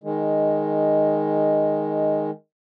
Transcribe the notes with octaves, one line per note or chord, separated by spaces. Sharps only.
D#3 G#3